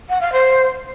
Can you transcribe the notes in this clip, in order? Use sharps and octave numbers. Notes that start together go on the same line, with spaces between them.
F#5
F5
C5